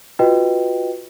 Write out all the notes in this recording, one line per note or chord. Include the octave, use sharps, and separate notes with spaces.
F4 F#4 B4 D#5 G5